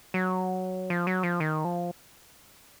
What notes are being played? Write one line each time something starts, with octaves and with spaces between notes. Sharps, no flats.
F#3
F3
F#3
F3
D#3
F3